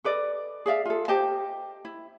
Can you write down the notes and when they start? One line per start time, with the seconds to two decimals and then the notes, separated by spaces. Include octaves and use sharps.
0.04 A4 B4 D5 D#5
0.66 G#4 D5 E5 F5
0.86 F4 A4
1.08 G4 C5 D#5 A5
1.85 E4